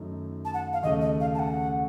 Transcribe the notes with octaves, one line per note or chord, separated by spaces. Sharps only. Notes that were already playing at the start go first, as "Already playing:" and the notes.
Already playing: F#2 D#3 A3 D#4
A5
F#5
F5
D#2 C#3 A3 D#5
D#5
F5
A5
F#5